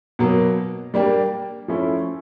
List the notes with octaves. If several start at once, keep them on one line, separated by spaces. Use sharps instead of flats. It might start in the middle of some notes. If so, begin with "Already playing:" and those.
B2 F#3 A#3
G3 A#3 D4 G4
F3 A3 C#4 E4